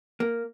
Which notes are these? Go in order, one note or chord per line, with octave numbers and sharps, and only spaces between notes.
A#3